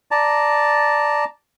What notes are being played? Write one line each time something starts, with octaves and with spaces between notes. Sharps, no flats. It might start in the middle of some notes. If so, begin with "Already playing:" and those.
D5 A5 A#5